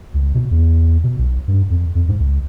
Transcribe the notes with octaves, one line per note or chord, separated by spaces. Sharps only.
C#2
B2
E2
B2
B1
G2
F2
F2
G#2
C#2